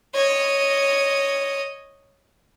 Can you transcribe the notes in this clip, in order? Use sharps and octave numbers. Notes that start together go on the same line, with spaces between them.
C#5 D#5